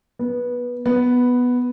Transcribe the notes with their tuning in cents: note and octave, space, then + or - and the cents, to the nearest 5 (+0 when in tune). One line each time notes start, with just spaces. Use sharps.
B3 -15
B3 +0